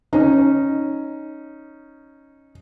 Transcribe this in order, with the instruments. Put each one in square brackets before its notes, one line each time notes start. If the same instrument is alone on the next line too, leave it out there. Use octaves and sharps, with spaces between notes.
[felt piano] C#4 D#4